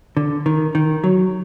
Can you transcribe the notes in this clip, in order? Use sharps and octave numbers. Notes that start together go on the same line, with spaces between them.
D3
D#3
D#3
F#3